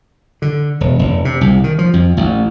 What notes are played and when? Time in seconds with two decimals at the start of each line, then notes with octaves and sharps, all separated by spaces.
0.42 D3
0.81 E1
0.99 F1
1.25 C3
1.41 C2
1.64 D#3
1.79 F3
1.93 F2
2.17 A1